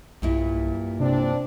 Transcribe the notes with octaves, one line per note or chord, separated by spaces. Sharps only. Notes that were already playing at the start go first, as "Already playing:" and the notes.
B1 G2 A#2 E4
C3 C4 D4